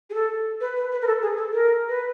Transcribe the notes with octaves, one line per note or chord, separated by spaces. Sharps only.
G#4
A4
B4
B4
B4
A#4
A4
G#4
A4
A#4
B4